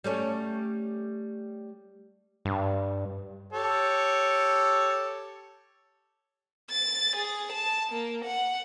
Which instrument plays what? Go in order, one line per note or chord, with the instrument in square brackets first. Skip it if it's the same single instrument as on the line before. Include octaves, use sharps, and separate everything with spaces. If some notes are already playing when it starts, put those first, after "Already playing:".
[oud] G3 A3 C#4
[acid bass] G2
[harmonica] G4 A4 C#5
[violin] A6
G#4
A5
A#3
F#5